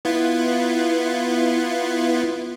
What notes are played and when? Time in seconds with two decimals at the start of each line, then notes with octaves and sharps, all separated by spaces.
0.05 B3 E4 F4